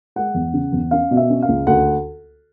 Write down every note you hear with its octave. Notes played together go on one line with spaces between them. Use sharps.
G#3 F#5
E2
C#3
E2
C#4 F5
B2
E5
C#4
F5
C#2
D2 F#5